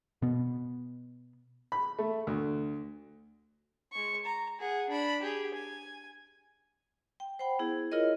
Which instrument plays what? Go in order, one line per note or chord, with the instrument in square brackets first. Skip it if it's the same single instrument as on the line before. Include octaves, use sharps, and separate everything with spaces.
[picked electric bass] B2 B3
[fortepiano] B5
A3
D2
[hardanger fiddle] G#3 C#6
A#5
G#4 F#5
D4 B5
G4 G#4
G#5
[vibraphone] G5
C5 F#5 G5 B5
B3 E4 G#4
E4 F4 G#4 A#4 C#5 D#5